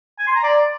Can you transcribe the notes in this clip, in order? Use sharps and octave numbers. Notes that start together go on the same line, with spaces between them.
G#5
C6
A#5
D5